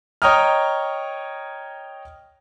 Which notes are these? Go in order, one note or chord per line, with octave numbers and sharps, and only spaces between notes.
C#5 D#5 G5 A#5 D#6 F6